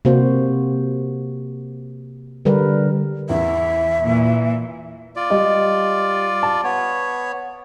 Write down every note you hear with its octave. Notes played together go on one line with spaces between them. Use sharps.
C3 A#3 F#4 C5
D3 G3 A#4 B4
E2 E3 E5
A#2 E3
F4 D5
G3 D#5
A5
B3 C#5